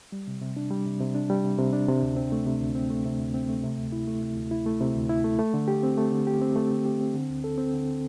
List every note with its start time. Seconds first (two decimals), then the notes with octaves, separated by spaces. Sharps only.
0.12 G3
0.28 C3
0.41 C3
0.57 D4
0.71 G3
0.86 C3
1.00 C3
1.15 D4
1.30 G3
1.44 C3
1.59 C3
1.73 D4
1.88 C3
2.03 D2
2.17 C4
2.32 A3
2.47 C3
2.61 D2
2.75 C4
2.90 A3
3.05 C3
3.20 D2
3.34 C4
3.49 A3
3.64 C3
3.78 D2
3.92 E4
4.07 A3
4.23 C3
4.37 D2
4.51 E4
4.66 A3
4.81 C3
4.96 D2
5.09 E4
5.24 A3
5.39 A3
5.54 D3
5.68 G4
5.83 C4
5.97 A3
6.12 D3
6.27 G4
6.41 C4
6.56 A3
6.70 D3
6.85 G4
7.00 C4
7.15 D3
7.29 D2
7.44 A4
7.58 C4
7.73 D3